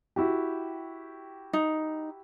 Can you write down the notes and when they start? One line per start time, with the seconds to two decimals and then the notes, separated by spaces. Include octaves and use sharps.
0.16 E4 F#4 G4
1.53 D#4